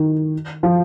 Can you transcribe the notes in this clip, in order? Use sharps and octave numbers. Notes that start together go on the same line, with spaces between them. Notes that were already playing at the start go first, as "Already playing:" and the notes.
Already playing: D#3
F3